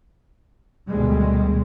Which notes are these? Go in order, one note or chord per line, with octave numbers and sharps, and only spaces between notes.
D2 B2 D#3 G3 G#3